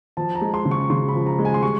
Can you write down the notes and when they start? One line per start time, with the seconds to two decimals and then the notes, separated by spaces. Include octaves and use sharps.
0.17 F3 A5
0.35 A#5
0.41 G#3
0.54 C6
0.65 C#3
0.71 C#6
0.90 C#3 C6
1.08 B5
1.15 F3
1.26 A#5
1.39 G#3
1.45 G#5
1.54 C6
1.63 G3 C#6